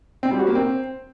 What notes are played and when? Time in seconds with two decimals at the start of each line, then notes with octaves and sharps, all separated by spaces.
0.23 C4
0.31 G3
0.39 F#4
0.47 A#3
0.55 C4